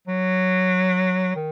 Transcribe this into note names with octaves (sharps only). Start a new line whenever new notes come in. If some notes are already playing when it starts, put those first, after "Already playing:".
F#3
D#3